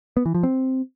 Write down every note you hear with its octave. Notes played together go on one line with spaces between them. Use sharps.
B3
E3
F3
C4